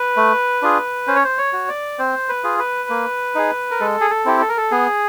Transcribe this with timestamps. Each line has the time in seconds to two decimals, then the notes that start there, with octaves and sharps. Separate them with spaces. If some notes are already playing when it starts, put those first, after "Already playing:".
Already playing: B4
0.17 A3
0.62 D4 F4 G#4
1.07 C#4 C5
1.16 C#5
1.24 C5
1.38 C#5
1.53 F#4
1.69 D5
1.99 C4 C5
2.29 B4
2.44 F4 G#4
2.59 B4
2.90 A#3
3.35 D#4 G#4
3.71 A#4
3.80 G#3 A4
4.01 G#4
4.10 A4
4.25 C4 E4 G4
4.41 A4
4.49 A#4
4.57 A4
4.71 B3 G#4